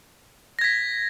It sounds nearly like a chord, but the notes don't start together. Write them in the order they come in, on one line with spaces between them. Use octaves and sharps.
A#6 G#6 B6